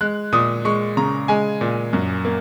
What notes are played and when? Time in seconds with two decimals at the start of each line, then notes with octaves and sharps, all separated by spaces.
0.01 G#3 F#6
0.33 A#2 D#6
0.65 G#3 C#6
0.97 C#3 A#5
1.28 G#3 G#5
1.61 A#2
1.93 F#2
2.25 A#3